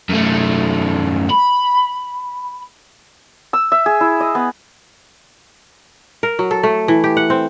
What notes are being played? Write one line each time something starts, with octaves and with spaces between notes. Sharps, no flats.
F#2 A3
B5
E6
E5
G#4
E4
D#5
B3
A#4
F#3
A4
A3
E3
G4
F#5
C4